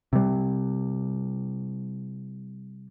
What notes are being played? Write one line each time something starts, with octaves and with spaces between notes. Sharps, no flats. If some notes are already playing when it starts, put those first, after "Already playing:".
C3 G3